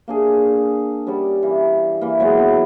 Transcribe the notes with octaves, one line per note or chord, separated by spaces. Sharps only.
A#3 D4 G#4
G3 C#4 D5 F#5
E3
E3 A#3
E3 F#3 G#3 B3
B3 A#4